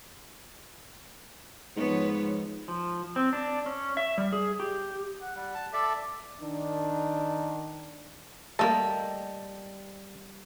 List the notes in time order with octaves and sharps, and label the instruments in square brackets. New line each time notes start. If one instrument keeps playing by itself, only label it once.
[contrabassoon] G#2 [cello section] F3 B3 C#5
[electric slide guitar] F3
C4
D4
C#4
E5
G3
G#4
G4
[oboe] F#5
[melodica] G3 [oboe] F#5
[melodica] A5
[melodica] A4 D5 E5 [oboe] D6
[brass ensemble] D#3 D4
[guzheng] G3 D#5 [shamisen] A3 A#3 A#4 [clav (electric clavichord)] A5